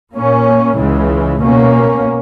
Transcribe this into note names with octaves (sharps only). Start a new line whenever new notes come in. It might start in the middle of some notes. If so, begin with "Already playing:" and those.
A#2 A#3 C#4
C#2 C#3 E3 G#3
B2 A#3 C#4